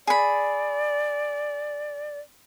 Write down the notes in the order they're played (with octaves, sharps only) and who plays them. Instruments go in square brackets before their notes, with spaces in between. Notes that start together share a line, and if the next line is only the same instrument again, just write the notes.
[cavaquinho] G#4 B5 [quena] D5